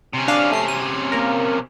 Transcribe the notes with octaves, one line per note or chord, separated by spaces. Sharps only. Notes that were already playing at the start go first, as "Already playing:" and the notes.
C3 C#4
D4 F5
A3 C7
D#7
A#3 A#4